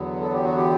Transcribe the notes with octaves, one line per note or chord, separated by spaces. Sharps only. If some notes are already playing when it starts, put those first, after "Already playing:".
Already playing: E2 D3 F#3 B3
A4
G4
F#4
G4